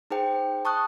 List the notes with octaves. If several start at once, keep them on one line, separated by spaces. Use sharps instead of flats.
D#4 G#4 C5 G5
A5 C#6 D#6 F#6